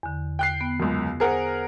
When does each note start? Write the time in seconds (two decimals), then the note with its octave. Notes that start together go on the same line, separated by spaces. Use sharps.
0.03 E2 D3
0.39 G5 F#6 C7
0.61 B3
0.80 C#2 F#2
1.20 G#4 A#4 C5 F#5